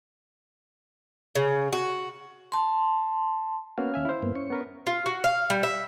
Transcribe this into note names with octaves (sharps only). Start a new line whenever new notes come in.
C#3
F#4
A5 C6
A#3 B3 C#4 F#4 F5
D#2 E5 G#5
E4 C5
G2 A#3 B3
C#4 C#6
B3 A#4 B4
F4
F#4
F5
G3
E5